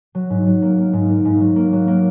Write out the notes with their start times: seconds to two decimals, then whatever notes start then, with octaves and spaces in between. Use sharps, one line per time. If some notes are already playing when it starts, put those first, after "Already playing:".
0.15 F#3
0.30 G#2
0.46 F#3
0.62 A#3
0.78 A#3
0.93 G#2
1.09 A#3
1.25 G#2
1.40 F#3
1.56 A#3
1.72 F#3
1.88 A#3